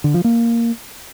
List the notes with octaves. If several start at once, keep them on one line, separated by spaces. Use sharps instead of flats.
D3
F3
A#3